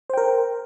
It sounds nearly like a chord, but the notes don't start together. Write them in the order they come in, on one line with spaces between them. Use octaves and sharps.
C5 G5 A#4